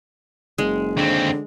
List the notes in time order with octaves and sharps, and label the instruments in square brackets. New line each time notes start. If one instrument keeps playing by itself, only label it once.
[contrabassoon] F#1 [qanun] G#3
[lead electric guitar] D#2 C4 [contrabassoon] D3